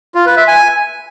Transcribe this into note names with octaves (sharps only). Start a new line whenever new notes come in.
F4
B4
E5
G#5